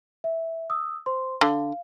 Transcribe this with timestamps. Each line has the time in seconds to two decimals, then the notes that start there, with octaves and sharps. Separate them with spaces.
0.24 E5
0.70 D#6 E6
1.06 C5 C6
1.41 D3 F5